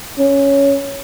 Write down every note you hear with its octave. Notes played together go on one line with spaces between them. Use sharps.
C#4